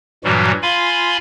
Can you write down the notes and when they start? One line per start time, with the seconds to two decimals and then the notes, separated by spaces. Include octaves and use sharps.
0.24 G2 A#2 E3 F#3 G3 F#4
0.62 F4 F5 G#5 B5 C6